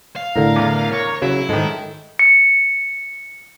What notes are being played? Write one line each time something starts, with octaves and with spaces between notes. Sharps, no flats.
F5
A2 D3 A#4
E2
C#5
C#3 F#3 E4
G#2 D#3 G#3 A4
C#7